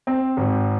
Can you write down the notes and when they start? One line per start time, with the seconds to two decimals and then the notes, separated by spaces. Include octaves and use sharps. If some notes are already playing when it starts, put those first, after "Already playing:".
0.07 C4
0.37 G#1